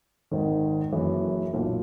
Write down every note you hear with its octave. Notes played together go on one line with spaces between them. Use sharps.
G#1 G#2 D#3
F#1 F#2 E3
B1 A#2 F#3